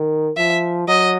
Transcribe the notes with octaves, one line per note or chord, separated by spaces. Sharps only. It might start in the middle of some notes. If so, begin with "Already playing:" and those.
Already playing: D#3
F3 E5
F#3 D#5